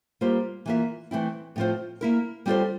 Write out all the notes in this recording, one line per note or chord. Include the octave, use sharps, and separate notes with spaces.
G3 A#3 F4 C5
E3 A#3 F4 A#4 E5
E3 A3 C4 E4
A2 F3 C4 F4 C5
A#3 E4 A#4
G3 C4 F4 A4 C5